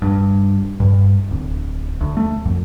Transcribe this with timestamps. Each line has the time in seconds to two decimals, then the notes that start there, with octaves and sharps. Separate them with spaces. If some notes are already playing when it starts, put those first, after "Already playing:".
0.02 G2
0.80 G2
1.31 D1
2.01 D2
2.17 A3
2.45 F2